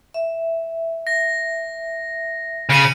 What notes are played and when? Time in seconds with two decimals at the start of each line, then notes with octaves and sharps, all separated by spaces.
0.14 E5
1.07 A#6
2.70 C#3 C#7 D#7 F#7